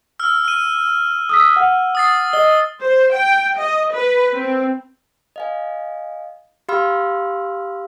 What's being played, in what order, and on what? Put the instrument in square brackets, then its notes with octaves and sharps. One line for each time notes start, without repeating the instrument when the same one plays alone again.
[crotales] E6 F6
F6 D#7
[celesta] D#6 E6 B6
F#5
[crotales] D#6 A6 C7
[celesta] D#5 [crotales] G7
[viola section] C5
G5
D#5
B4
C4
[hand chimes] D#5 F5 G#5
G4 F5 B5 C6 E6 F6